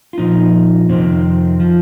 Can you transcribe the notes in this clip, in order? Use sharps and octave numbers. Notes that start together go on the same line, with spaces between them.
F4
A#2 F3 D#4
F2 C3 D#3 C4
F3